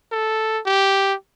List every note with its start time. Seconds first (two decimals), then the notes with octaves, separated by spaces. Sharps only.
0.12 A4
0.66 G4